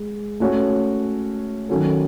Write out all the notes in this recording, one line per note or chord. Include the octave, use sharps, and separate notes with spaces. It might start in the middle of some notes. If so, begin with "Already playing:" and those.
Already playing: G#3
A3 C#4 F#4 C#5
D#3 F#3 C#4 F#4 A4